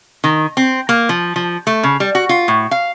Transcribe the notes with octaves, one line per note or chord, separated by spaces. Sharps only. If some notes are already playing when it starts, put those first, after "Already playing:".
D#3
C4
A#3
F3
F3
A3
C#3
G3
F#4
F4
A2
F5